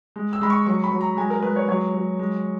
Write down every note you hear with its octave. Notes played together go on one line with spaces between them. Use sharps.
G#3
E6
G#3 B5
C#6
F#3 C#6
B5
F#3
A#5
G#3 G#5
A#4
G#3 B4
C#5
F#3 C#5
F#3
G#3